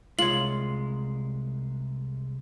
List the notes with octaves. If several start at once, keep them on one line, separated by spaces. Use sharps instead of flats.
C2 G#3 F4 C#5 F#7